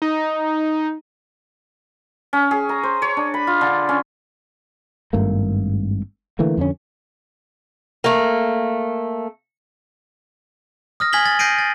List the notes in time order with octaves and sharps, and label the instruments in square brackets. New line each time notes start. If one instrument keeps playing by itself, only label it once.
[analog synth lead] D#4
[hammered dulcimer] C#4
G#4
A#5
C5
C#5
D4
B5
F4
D3
C#4
[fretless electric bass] G#1 G2 A3 A#3
D3 E3 A3 A#3
F2 D3 A#3 C#4
[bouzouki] A3 A#3
[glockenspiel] D#6 F6 A#6
G#5 F6 G#6 B6 F#7 G7
A6
G6 A#6 C7 D7 D#7
A6